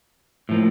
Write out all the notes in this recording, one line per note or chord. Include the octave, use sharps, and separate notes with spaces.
A2 F3 A#3